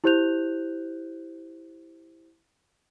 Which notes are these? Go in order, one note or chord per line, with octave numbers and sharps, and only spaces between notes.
E4 G4 C5 F#6 G6 F7